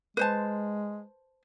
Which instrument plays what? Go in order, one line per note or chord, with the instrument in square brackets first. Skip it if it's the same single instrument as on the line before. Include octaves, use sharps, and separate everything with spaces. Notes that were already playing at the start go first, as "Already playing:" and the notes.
[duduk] G#3 [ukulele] B4 C5 A5